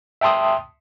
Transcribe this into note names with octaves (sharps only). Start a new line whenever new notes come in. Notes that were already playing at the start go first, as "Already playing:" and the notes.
E5 G5 A5 C6 D#6